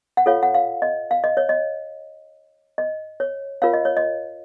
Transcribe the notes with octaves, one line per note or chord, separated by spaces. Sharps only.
F#5
F4 A4 C#5 F5
F#5
F5
D#5
F5
D#5
C#5
D#5
D#5
C#5
F4 A#4 C#5 F5
D#5
C#5
D#5